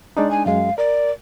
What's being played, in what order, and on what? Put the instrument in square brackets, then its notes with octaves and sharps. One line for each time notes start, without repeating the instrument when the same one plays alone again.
[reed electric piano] G#3 D4 D#4 [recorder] D5
[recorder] G#5
[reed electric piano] F#2 G#3 [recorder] F5
[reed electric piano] A#4 [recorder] D5